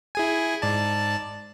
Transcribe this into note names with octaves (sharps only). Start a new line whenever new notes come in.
E4 G#4 G#5
G#2 D5 A5